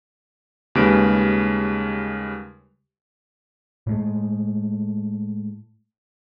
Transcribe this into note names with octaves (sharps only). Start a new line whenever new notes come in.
D#2 C#3 G3 G#3 B4 D7
A2 G#3 A3